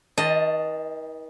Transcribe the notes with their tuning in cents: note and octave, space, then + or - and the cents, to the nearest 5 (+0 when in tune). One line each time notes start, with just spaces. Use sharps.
D#3 +45 D#5 +0 A5 +10